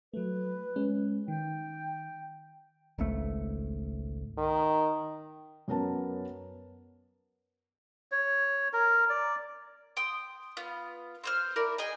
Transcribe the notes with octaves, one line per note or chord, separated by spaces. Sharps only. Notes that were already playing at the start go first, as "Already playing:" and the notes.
F#3 A3 B4
G#3 C#4
D#3 G5
G#1 C#2 A3
D#3
F#2 B3 C#4 A#4 B4 A5
C#5
A#4
D5
G5 C6 D#6
B3 F4
C4 C5 F6
E4 A#4 D5
G#4 D#5 G5 G#5